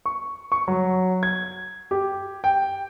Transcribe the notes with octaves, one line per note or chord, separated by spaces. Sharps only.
C#6
C#6
F#3
G#6
G4
G5